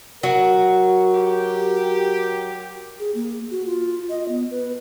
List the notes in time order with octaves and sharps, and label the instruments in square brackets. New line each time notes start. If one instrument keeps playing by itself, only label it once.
[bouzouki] F#3 [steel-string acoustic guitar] F#4 [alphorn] A#4
[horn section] G4
[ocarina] G#4
A#3
F#4
F4
D#5
B3
B4